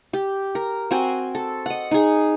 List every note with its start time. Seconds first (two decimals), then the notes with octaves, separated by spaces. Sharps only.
0.13 G4
0.55 A#4
0.91 C4 F#4 G5 G#5
1.35 A4
1.66 D#5 F#5
1.91 D#4 G#4